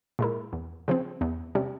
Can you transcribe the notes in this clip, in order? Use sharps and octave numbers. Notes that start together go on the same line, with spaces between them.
A#2 G#3 E4 A#4
E2
C#3 F3 C4
E2
C3 G3 C#4